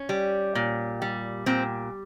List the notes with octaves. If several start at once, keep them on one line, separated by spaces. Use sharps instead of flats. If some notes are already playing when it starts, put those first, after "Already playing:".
Already playing: C#4
G3
A#2
G3
A#2 C4